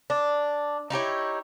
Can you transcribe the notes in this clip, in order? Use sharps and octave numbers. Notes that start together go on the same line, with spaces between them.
D4
D#4 E4 G4 C#5